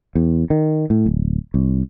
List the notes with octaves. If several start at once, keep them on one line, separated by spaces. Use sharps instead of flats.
E2
D#3
A2
D1
C2